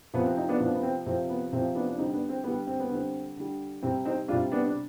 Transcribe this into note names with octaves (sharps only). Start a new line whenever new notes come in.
C3 F3 B3
C4
C4 D#4
B3 D4
C3 F3 B3 D4
B3
C4
C3 F3 C4
B3
C3 F3 C4
B3 D4
D4
D3 G3 C4 D#4
B3 D4
C4
D3 G3 B3
C4
B3
D3 G3 C4
D3 G3
C3 G3 C4
C4 D#4
C3 G3 D4 F4
B3 D4
D4